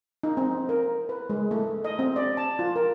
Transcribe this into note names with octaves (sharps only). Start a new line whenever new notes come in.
D#4
C4
A#4
B4
G#3
A3
D#5
C4
D5
A5
F4
A#4